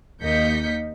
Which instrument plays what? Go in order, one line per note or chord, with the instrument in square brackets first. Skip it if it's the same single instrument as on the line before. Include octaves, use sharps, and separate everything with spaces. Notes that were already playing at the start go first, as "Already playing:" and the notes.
[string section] D#2 A#3 D#5 G6 B6 C#7